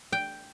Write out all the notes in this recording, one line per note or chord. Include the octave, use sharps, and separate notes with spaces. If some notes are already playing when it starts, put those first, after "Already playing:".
G5